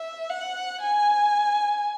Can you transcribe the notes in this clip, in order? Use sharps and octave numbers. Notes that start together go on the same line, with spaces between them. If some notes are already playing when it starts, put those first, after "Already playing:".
Already playing: E5
F#5
G#5